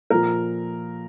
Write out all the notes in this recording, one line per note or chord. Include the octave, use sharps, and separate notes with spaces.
A#2 F3 A#4